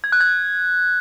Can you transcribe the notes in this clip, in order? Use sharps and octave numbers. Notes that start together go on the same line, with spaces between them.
G#6
F#6
G#6